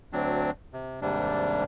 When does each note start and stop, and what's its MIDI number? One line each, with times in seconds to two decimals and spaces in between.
0.13 0.51 38
0.13 0.51 54
0.13 0.51 60
0.13 0.51 62
0.73 1.00 48
1.02 1.64 39
1.02 1.64 44
1.02 1.64 48
1.02 1.64 55
1.02 1.64 62